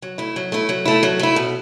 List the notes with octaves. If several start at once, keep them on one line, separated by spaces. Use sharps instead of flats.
F#3
A3 E4
F#3
A3 E4
F#3
A3 E4
F#3
A3 E4
B2